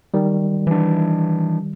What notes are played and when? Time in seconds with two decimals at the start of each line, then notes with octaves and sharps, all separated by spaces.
0.14 D#3 G3
0.67 E3 D4